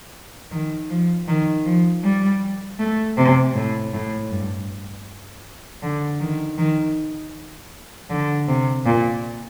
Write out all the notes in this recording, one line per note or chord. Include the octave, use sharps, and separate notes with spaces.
D#3
F3
D#3
F3
G3
A3
C3
A2
A2
G2
D3
D#3
D#3
D3
C3
A#2